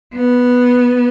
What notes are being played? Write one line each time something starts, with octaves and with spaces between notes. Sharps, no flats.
B3